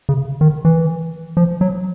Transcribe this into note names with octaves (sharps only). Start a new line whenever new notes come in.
C#3
D#3
E3
F3
F#3